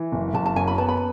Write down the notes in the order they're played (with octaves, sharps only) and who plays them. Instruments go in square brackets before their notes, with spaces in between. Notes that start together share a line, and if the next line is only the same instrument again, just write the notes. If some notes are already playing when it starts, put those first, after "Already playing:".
Already playing: [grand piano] E3
F#1
[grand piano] F#1 [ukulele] A5
[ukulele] A5
[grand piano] F#2 [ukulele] G#5
[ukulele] B5
[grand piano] B3 [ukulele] A5
[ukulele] B5